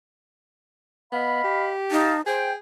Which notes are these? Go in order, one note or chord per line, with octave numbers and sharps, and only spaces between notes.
B3 D#5 F5 B5
G4
D#4 D#5 F5 A5
G#4 C5 G5